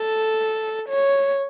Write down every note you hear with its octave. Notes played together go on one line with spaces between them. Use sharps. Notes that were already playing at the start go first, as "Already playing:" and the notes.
Already playing: A4
C#5